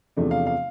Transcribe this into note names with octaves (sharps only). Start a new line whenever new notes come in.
E2 C3 F3 A3 D4
F5
F5